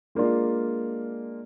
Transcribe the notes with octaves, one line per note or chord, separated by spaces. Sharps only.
G#3 A#3 D4 F4